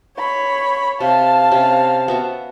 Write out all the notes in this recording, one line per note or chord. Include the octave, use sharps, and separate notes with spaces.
C#5 B5
C3 F5 A5
C3 C#4
B3 F#4 E5